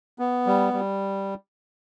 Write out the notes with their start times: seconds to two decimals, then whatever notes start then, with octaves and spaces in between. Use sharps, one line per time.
0.19 B3
0.47 G3
0.73 G3